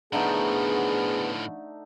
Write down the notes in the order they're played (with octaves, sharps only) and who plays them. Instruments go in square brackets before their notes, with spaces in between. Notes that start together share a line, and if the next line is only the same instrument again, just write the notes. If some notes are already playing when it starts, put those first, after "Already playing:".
[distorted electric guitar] A2 F3 [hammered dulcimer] D3 A3 D#4 [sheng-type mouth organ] B3 [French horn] G#4